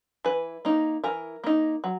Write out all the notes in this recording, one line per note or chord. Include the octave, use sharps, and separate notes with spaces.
E3 B4
A#3 D#4
E3 A#4
A#3 D#4
F#3